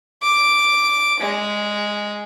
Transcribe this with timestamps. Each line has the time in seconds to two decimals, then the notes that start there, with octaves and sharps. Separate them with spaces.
0.22 D6
1.20 G#3